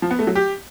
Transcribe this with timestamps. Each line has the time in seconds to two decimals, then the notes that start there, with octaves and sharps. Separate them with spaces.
0.02 F3
0.11 B3
0.19 A3
0.27 F#3
0.35 G4